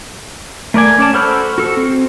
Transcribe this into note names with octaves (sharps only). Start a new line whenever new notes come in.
A3 A#4 D5 G#5
C#4 D5 A5
F#4 A4 C5 B5 F6
F#4 A4
C4